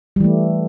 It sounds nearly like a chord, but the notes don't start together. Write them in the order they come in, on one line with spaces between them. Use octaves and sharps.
G3 E3 A3